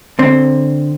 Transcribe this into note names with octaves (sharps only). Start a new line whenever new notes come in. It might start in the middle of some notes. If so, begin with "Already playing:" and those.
D3 C4